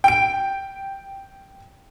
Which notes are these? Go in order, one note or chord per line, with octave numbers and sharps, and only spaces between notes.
G5 D7